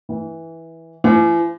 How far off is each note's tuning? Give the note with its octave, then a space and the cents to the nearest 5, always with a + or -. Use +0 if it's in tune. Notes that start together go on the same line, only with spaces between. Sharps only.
E3 -10
E3 +45